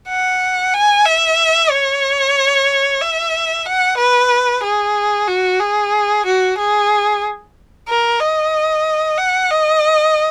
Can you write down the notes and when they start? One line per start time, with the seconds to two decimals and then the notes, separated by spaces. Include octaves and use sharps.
0.09 F#5
0.74 G#5
1.06 E5
1.71 C#5
3.01 E5
3.66 F#5
3.98 B4
4.63 G#4
5.28 F#4
5.61 G#4
6.26 F#4
6.58 G#4
7.88 A#4
8.20 D#5
9.18 F#5
9.50 D#5